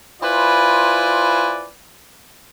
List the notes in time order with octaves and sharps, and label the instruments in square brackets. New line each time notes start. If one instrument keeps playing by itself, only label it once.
[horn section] E4 F4 B4 C5 D5 G#5